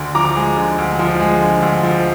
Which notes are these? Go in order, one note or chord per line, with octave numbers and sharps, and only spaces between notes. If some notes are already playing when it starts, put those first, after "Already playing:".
Already playing: D2 D3
F3 A#5 D6
G#3
D3
D2
F3
G#3
D3
D2
F3